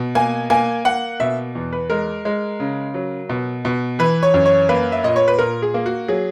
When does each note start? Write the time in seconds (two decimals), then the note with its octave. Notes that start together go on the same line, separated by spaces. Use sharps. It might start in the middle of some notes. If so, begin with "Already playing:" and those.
Already playing: B2
0.15 A#3 G#5
0.50 A#3 G#5
0.85 A#3 F#5
1.20 B2 E5
1.55 E2
1.73 B4
1.90 G#3 A#4
2.25 G#3
2.60 C#3
2.94 F#3
3.29 B2
3.65 B2
3.99 E3 B4
4.23 C#5
4.34 F#2
4.46 C#5
4.69 A#3 B4
4.92 E5
5.04 A#2 D#5
5.16 C#5
5.28 B4
5.39 A#2 A#4
5.62 G#4
5.74 A#3
5.86 F#4
6.08 F#3 G#4